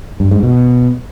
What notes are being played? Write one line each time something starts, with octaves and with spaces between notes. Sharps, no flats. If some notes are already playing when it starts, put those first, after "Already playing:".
G2
G#2
B2